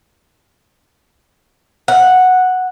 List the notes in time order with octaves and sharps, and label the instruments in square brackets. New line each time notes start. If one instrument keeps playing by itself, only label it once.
[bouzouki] F#5